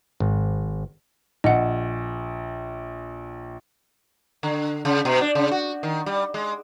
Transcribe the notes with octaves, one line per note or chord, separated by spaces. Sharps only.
G#1
A#1 D#5 F#5
D3
C#3
B2
D4
C#3
F#4
D#3
G3
G#3